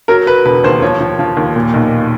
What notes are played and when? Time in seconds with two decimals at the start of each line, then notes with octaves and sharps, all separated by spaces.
0.08 F#3 A#4
0.26 F#3 B4
0.45 E1 B4
0.64 D#2 C5
0.82 F3 C#5
1.00 F3
1.19 F3
1.37 D#2
1.56 A#2
1.74 B1